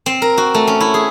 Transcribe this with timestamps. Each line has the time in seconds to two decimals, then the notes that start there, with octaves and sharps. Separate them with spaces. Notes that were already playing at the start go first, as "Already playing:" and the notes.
0.06 C4
0.22 A#4
0.38 F#4
0.55 A3
0.68 C#4
0.81 E4
0.94 G#4